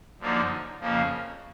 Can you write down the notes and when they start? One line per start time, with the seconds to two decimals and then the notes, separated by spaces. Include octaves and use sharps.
0.19 F#2 D3 F3 A#3 D#4
0.79 F2 C#3 F3 A#3